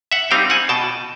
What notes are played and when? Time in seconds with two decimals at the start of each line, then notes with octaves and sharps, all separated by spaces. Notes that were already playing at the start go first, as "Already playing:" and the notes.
0.12 E5 F#5
0.31 G3 C4 D#4 F5 G5
0.50 F#5 G#5
0.69 B2 G5 A5